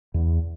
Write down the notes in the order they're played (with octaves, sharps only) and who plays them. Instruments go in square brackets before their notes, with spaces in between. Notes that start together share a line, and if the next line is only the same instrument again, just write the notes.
[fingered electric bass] E2